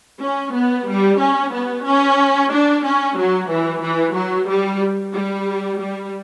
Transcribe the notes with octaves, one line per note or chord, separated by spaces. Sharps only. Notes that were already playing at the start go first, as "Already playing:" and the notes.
C#4
B3
G3
C#4
B3
C#4
D4
C#4
F#3
E3
E3
F#3
G3
G3
G3